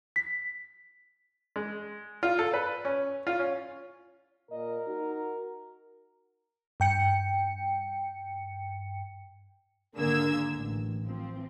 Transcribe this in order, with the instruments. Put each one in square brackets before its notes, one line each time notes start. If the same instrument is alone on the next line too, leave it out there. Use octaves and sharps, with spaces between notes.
[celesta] B6
[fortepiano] G#3
F4
A4
B4
C#4
F4
C#4
[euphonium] A#2 [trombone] A#4 [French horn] D#5
[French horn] D#4 [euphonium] F#4
[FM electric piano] G2 G5 C#7
[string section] G#1 D3 A#3 G#4 E6 G#6
A1
F3 C4